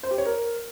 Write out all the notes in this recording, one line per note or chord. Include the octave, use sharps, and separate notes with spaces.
C5
G4
C#5
A#4